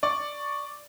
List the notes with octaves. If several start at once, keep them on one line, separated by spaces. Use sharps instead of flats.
D5 C#6 D6